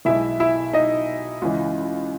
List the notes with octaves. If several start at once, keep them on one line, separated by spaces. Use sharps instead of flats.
B1 B2 G#3 E4 E5
E4 E5
D#4 D#5
C#2 C#3 E3 G#3